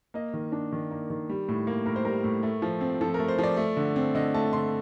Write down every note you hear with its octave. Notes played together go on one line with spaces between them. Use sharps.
A#3 D#5
D#3
D4
D#3
A#3
D#3
G3
A2
A#3
A2 A#4
C5
G3 A#4
A2
A3
F3
C4
F3 A4
A#4
A3
C5
F3 D5
A3
D3
C4
D3 D#5
A3 A5
D3 C6